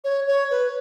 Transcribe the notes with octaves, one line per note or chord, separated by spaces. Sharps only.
C#5
C#5
B4